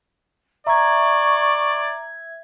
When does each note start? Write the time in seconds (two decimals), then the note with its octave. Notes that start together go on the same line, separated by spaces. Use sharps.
0.67 D5 E5 A#5 C#6 G#6